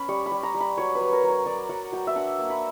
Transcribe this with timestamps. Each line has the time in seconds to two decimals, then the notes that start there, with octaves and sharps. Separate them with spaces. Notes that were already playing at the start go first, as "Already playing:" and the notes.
Already playing: C#4 B5
0.09 G3 C#6
0.26 B5
0.32 G3
0.43 A#5
0.54 G3
0.61 B5
0.78 F#3 C#5
0.95 B4
1.01 F#3
1.13 A#4
1.23 F#3
1.30 C#5
1.46 F#3 D5
1.69 F#3 F#5
1.92 F#3 G5
2.07 E5
2.16 D4 F#5
2.39 A#3
2.50 B5